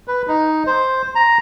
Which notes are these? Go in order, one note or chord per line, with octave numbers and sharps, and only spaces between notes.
B4
D#4
C5
A#5